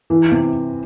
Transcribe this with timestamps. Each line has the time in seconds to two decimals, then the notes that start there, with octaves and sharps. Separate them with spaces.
0.10 E3
0.31 C3